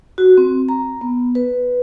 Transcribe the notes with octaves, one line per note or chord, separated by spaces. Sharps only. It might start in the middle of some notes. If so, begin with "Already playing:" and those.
F#4
C4
A#5
B3
B4